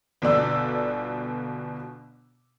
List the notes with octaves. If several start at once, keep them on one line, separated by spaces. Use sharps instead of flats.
G1 B2 D5 E6